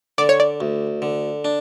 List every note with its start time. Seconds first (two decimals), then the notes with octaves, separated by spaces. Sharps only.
0.18 D3 D5
0.29 C#5
0.40 D5
0.61 D2
1.02 D3
1.45 D4